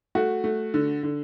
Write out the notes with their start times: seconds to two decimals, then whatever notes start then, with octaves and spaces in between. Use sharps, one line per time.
0.15 A3 F#4
0.44 A3
0.74 D3
1.03 D3